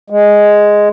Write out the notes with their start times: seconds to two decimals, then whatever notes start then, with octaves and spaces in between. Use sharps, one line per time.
0.10 G#3